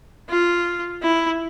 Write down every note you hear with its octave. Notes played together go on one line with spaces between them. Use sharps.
F4
E4